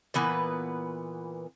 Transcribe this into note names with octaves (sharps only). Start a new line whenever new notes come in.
A#2 E3 B3 B4